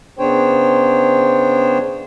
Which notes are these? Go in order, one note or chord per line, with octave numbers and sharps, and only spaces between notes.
C#3 B3 D4 C5 C#5 G5